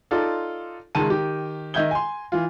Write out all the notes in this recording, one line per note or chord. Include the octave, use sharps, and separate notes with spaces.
D#4 F4 A4 D5
C#2 D#3 G#3 A5 D#7
D#3 G4
D#3 D#5 E5 G6 G#6 G7
G#5 C6
E3 F4